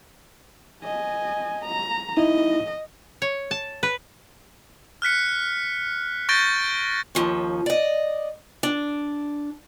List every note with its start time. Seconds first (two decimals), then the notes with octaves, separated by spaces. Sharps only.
0.83 D#5 G#5
1.65 A#5
2.17 D#4 E4 D#5
3.22 C#5
3.51 A5
3.83 B4
5.02 F6 F#6 B6 C#7
6.29 C#6 G6 A6 A#6 D7 G7
7.15 D#2 F3 C#4
7.66 D5 D#5
8.63 D4